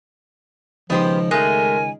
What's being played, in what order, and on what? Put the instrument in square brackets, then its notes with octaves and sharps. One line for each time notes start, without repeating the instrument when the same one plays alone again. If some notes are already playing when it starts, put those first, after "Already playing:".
[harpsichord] C#2 D#3 D#4 [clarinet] F3 [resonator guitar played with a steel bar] B3 G4 C5
[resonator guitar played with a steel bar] G#3 A3 [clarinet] A#4 [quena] G#5